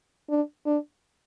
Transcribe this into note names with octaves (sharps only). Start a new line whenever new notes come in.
D4
D4